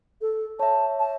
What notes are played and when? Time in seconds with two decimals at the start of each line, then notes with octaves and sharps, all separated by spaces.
0.21 A4
0.59 C#5 E5 A5
0.99 A5